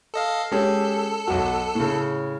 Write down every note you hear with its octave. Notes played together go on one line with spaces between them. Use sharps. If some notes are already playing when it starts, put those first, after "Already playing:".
A4 D#5 F5
G#3 C#4 G4 A4
B1 F#4
A2 C#3